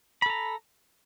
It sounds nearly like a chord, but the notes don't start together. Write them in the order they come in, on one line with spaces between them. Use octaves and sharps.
B5 A4 A#5